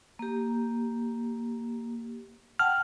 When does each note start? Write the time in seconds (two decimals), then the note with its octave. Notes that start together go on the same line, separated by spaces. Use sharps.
0.19 A#3 G4
2.59 F#5 G5 A5 F6